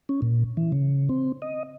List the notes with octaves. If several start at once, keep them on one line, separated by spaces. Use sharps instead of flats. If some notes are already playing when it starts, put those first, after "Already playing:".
C#4
A#2
E3
C#3
C4
D#5